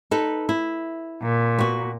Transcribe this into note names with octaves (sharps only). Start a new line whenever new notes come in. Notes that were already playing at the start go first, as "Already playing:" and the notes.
D#4 A4 B4
E4
A#2
B3 F#4